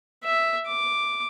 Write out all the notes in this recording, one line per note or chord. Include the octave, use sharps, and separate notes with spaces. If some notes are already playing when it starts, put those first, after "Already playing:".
E5
D6